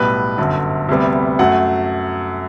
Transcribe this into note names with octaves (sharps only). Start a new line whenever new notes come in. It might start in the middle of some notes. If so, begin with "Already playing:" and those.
Already playing: B1 A2 G3 B3 B4
G1 F#2 D3
D2 C3 G3 B3
F#2 F#3 A3 F#5